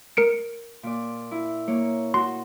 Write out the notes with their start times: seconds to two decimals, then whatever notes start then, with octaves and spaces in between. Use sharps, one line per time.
0.17 A#4 C#7 D7
0.83 A#2 D5
1.31 E4
1.68 A#3 C#5
2.14 F#4 C6